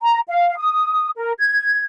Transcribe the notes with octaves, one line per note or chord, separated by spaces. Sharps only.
A#5
F5
D#6
A#4
G#6